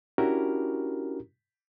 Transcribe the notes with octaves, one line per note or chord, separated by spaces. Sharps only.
C#4 D4 E4 F#4 G4 A#4